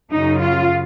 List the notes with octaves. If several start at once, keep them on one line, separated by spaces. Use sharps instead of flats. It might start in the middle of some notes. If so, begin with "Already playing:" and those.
F#2 C#3 F#3 D#4
F4